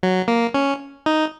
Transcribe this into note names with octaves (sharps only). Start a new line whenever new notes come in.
F#3
A#3
C#4
D#4